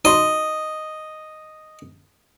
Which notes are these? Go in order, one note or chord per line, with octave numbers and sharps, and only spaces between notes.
D#4 F#4 D#5 C6